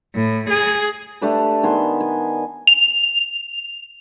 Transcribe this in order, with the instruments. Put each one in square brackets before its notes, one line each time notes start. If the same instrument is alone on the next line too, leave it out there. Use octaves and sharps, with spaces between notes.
[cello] A2
G#4
[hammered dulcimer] A3 D4 G4 B4
D#3 B3 G#5 C6
G#5
[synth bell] F7